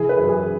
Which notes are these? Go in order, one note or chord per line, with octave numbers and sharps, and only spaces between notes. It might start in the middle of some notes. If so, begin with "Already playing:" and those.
Already playing: E3 G#4
B4
F#2
G#4